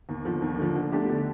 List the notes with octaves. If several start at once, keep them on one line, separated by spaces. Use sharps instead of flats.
D#2
D3 F3
D#2
D3 F3
D3
A3 D4 G4
D3